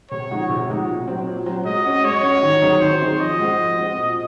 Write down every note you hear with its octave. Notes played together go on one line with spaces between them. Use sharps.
C3 C#5
F3 G#3 D#4 F#4
C3
F3 G#3 D#4 F#4
A#2
F#3 C4
A#2
F#3 C4
G#3 D#5
C#4 F#4
G#3 C#5
C#4 F#4
D#3
F#3 C4 D#4 G#4
D#3 C5
F#3 C4 D#4 G#4
F3 D#5
G#3 C4 F#4
F3
G#3 C4 F#4
A#2